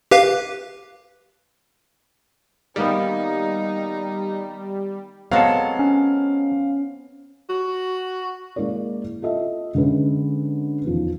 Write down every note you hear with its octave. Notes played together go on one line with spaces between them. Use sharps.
G4 B4 F5
D#3 G3 A#3 B3 D#4
F#3 G#3 B3 C4 A4 F5
C#4
F#4
G#3 A#3 E4 A#4 D5
F4 A4 D#5 E5
D3 G#3 C#4 B4
E2 D#3 F3